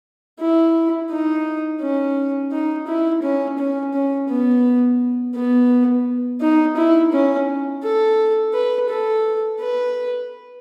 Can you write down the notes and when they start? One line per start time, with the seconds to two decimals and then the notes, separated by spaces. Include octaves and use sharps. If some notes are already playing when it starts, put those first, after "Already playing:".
0.40 E4
1.10 D#4
1.81 C#4
2.52 D#4
2.87 E4
3.23 C#4
3.59 C#4
3.93 C#4
4.29 B3
5.35 B3
6.41 D#4
6.76 E4
7.12 C#4
7.83 A4
8.54 B4
8.90 A4
9.60 B4